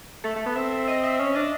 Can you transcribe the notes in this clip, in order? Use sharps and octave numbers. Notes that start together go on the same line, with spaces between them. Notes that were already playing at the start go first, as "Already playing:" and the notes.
A3 A4
A3
B3
C4 E5
E5
D#5
E5
C#4 E5
D4 D#5